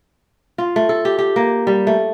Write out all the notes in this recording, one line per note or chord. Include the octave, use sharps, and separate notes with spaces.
F4
A3
A4
G4
G4
A#3
G3
A3